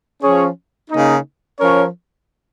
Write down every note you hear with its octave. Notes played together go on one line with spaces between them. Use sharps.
F3 C#4 G#4 C#5
C#3 A#3 D#4
F3 C#4 A#4 C#5